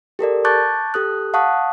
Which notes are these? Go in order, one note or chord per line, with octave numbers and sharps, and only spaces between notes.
G4 A4 A#4 D5
A5 C#6 D6 F#6 G6 A6
G4 A4 D#6 F#6
F5 F#5 A5 C#6 D#6 F#6